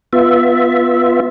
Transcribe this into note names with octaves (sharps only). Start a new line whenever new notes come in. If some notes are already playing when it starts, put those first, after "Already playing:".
B3 F4 E5